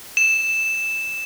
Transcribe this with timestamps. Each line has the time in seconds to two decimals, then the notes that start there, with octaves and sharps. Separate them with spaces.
0.17 E7